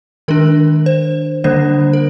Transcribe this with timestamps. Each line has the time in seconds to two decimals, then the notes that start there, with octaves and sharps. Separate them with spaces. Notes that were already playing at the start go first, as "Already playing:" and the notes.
0.28 D#3 G#3 D4 A#4
0.86 C5
1.44 D3 G3 A#3 D4 C5
1.93 A#4